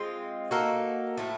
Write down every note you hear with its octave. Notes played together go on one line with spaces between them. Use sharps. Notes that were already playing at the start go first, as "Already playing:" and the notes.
Already playing: G#3 C4 F4
A#3 D#4 F#4 A4
A2 F3 A3